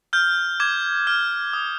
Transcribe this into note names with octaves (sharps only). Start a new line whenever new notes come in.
F6 G6
D6 G#6
F6
D#6